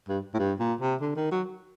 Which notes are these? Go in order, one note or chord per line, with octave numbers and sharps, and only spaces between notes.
G2
A2
G2
A#2
C3
D3
D#3
F#3